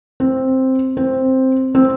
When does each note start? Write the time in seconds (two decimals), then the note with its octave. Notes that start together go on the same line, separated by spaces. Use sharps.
0.20 C4
0.97 C4
1.75 C4